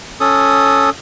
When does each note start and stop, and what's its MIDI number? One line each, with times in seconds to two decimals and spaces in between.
0.20 0.90 61
0.20 0.90 69
0.20 0.90 87